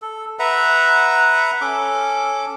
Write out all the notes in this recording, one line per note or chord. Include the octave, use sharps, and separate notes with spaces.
A4
B4 E5 F#5 A#5
C#4 A4 D6